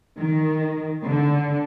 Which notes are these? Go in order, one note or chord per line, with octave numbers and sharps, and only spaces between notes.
D#3
D3